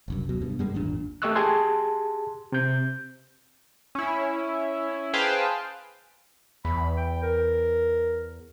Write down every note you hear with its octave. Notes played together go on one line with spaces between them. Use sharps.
F#1 C2 F#2
D2 B2 F#3
G2 B2
F#2 G3 G#3 A#3
G#1 E2 A#2 D4
A3 G4 D#5 C#6 E6 F#6
G4 G#4 A5 C6 G#6
C3 G6
C#4 E4
G#4 B4 C5 F5 G5 A5
E2 B5
G5
A#4